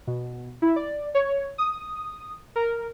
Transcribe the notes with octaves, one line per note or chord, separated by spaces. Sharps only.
B2
E4
D5
C#5
D#6
A#4